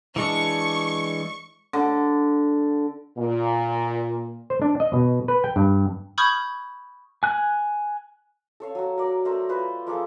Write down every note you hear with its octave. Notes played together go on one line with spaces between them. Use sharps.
E3 G#3 D4 C#6
D3
A#2
C5
D4
D#5
B2
B4
G5
G2
B5 C#6 D#6 F6 G6 G#6
G#5 F#6
A4 C#5 F5
F#3 F#4
A#4 D5
A3 A#4 C5
F4 B4 C5
F3 A#3 G#4 A4